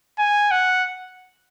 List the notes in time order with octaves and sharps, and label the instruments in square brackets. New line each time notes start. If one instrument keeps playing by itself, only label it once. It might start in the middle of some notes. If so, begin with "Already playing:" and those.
[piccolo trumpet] G#5
F#5